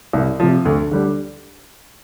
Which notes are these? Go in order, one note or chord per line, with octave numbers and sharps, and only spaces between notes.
C2
C3 F3
D2
D3 G3